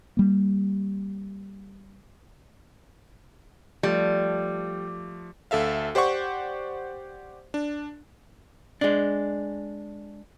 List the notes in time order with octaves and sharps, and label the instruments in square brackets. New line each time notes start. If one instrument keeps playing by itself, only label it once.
[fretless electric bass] G3 A#3
[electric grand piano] F3 A3 [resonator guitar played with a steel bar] G3
[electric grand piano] D2 A4 E5 F5
G4 C5 D5 F#5 C#6
D4
[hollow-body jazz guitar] G#3 D4